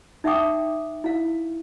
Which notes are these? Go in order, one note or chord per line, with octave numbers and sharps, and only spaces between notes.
D#4 E5 F#5 G5 D6 D#6
E4 F5